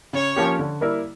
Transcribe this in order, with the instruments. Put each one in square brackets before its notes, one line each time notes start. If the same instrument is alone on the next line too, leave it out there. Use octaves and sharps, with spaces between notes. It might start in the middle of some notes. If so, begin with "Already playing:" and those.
[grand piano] C#3 [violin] C#5
[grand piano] F3 A#3 C#4 G4
D3
G3 A#3 E4 A#4